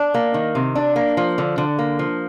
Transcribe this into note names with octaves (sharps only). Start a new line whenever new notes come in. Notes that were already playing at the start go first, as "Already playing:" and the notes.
Already playing: D4
A#3
D#3
C3
D4
A#3
F3
D3
D3
A#3
F3